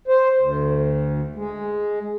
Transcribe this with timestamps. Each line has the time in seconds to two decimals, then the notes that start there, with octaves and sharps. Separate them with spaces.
0.08 C5
0.39 D2
1.35 G#3